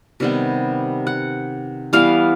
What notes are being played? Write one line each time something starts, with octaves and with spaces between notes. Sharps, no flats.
C3 D#3 G3 B3
F#5
E3 G3 B3 F5